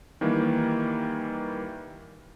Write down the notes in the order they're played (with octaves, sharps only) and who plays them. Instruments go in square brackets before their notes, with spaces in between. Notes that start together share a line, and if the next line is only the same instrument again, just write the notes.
[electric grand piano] D#3 E3 G3 A#3